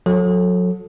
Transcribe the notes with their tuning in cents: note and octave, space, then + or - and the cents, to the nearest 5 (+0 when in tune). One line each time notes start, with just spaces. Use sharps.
F#3 -30 A4 +0